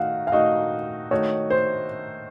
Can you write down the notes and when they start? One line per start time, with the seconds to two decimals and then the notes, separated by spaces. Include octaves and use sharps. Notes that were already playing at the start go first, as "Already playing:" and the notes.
Already playing: D#3 A3 D#4 F#4 F5 F#5
0.27 F5
0.32 D#3 A3 D#4 F#4 D#5
1.11 D#3 A3 D#4 F#4 C#5
1.50 C5